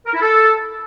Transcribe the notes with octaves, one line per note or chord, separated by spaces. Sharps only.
A#4
E4
A4